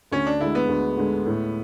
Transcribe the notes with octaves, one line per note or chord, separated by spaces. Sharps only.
D2 C#4
D4
D3 G#3 E4
B3
D2
D3 G#3
A2